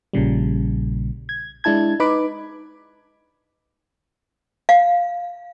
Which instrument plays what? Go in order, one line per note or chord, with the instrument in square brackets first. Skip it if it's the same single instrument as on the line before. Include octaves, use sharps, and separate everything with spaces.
[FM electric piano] A#1 A#2 C#3 G3
G#6
G#3 D4 E4 A5 G#6
D#4 B4 B5 D6
[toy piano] F5